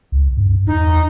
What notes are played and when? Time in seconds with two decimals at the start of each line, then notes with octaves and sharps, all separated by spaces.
0.12 C#2
0.37 G2
0.67 E2 D#4